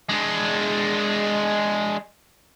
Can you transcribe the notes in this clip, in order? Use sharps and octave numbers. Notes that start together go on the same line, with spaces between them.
G#3 D4